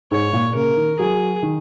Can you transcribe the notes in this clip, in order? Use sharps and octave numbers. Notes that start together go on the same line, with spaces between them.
G#2 C#5
A#2
C#3 A#4
D#3
F#3 G#4
D#3